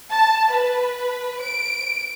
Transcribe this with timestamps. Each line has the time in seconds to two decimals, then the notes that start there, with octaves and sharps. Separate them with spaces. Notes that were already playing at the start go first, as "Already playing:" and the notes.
0.12 A5
0.51 B4
1.42 D7